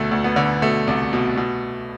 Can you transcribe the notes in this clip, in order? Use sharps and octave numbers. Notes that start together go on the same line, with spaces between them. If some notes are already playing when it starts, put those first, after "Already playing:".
Already playing: D2 B2 A3
D2
B3
D3
B2 A3
C2
B2
B2